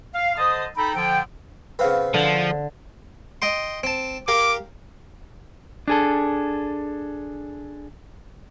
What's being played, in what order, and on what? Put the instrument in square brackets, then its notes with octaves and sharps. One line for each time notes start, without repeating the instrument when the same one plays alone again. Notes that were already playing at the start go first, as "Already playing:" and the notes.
[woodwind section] F5
D3 C5 D#5 A5 D#6
D#4 A4 G5 A#5 B5
D3 F3 G5
[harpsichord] C#3 B3 C4 [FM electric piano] B4 F5
[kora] D3 [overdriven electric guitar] F3
[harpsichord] D#5 G5 C6
C4 A5
[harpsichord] G4 A#4 F5 [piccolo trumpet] D6
[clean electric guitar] D4 G#4 A4